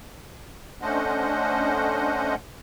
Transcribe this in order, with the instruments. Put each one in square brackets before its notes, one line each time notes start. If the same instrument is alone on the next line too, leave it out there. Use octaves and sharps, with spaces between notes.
[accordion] A3 C#4 D4 C5 D#5 F#5